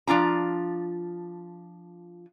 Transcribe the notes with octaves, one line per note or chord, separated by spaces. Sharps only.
F3 D4 F4 A#5